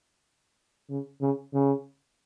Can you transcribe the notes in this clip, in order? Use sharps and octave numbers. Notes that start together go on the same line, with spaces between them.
C#3
C#3
C#3